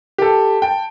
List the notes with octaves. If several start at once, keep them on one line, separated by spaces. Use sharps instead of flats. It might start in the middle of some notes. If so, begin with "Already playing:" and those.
G4 A4
G5 A5